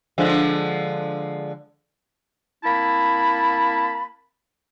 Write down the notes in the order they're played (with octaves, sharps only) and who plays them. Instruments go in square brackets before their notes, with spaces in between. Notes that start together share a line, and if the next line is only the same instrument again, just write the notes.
[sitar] D3 F3 G#3
[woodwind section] A#3 C4 E4 A5 B5